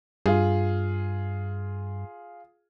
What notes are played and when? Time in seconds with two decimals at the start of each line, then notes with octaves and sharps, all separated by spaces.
0.26 G2 F4 G#4